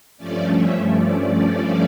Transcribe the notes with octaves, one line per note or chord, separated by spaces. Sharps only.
G2 F3 A3 C#4 D5
E5
D5